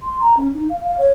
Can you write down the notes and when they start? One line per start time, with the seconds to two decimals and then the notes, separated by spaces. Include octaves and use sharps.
0.01 C6
0.20 A#5
0.37 C#4
0.54 D#4
0.70 F5
0.84 F5
0.98 C#5